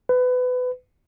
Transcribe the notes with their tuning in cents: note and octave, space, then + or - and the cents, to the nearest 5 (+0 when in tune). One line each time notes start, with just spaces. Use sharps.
B4 +25